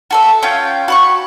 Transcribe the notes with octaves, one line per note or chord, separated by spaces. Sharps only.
F#4 A4 E5
C#4 F4 G5
F#4 B5 C#6